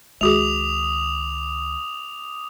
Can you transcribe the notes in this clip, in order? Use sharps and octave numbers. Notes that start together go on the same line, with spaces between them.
C#2 D#3 G#3 F#4 G#4 D6 D#6 F7